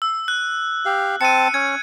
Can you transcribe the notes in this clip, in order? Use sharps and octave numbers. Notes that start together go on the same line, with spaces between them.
E6
F#6
G4 F5
C4 A5 C#7 D#7
C#4 G#6